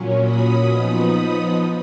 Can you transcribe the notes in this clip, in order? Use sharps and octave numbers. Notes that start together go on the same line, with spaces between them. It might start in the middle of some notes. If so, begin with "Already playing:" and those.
Already playing: A#2 F#3 C#4
B5 D#6
F3 B3 D#4